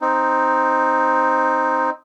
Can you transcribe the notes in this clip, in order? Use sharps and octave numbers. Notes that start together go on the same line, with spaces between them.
C4 D#4